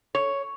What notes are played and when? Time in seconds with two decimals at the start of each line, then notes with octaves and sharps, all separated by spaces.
0.15 C#5